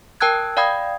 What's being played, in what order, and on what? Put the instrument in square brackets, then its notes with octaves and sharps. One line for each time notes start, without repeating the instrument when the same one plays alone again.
[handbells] A#4 G5 A5 E6 F#6 G#6
D5 F5 G5 B5 D#6 G#6